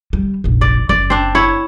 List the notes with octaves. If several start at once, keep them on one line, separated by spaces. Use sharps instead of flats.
G3
F1 A#1
D5
F#1 D5
C4 D4
E4 C#5